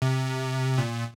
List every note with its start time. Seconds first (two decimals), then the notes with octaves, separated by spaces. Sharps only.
0.02 C3
0.78 A#2